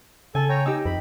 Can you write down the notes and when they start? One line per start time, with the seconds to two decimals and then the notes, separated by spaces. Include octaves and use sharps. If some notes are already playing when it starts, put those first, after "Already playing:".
0.35 C#3 A4 G#5
0.49 C#5 G5 A#5
0.66 D#4 G4 E6
0.85 F2 B5